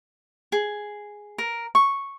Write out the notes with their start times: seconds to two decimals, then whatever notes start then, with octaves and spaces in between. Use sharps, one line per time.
0.52 G#4
1.38 A#4
1.75 C#6